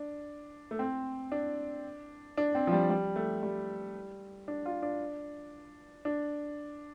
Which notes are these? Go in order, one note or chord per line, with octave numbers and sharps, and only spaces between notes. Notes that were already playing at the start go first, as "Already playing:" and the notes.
Already playing: D4
A3
C4
D4
D4
C4
F3
G3
G3
A3
G3
D4
F4
D4
D4